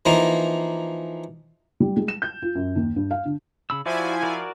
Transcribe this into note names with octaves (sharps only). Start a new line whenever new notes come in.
E3 F3 A#3 D#4
G3
G#3
E7
G6
F4
F#2
D#2
G2
F5
D3
C#3 B5 E6
F3 E4 F#4 D5 G#5
F#4 A#4 D5